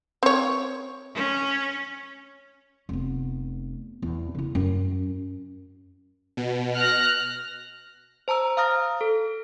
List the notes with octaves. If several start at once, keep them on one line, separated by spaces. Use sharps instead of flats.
C4 C#5
C#4
F1 B3
E2
C#3 E4
F#2
B2
F6 F#6 A#6
C5 A5 A#5 E6
F5 A#5 D#6 F6 A#6
A4